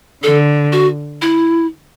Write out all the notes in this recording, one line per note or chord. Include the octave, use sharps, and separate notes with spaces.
D3 A4
F#4
E4